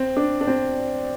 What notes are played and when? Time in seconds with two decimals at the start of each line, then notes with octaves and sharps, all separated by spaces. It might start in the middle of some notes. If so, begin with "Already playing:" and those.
Already playing: C4
0.17 D4
0.41 D4
0.47 C4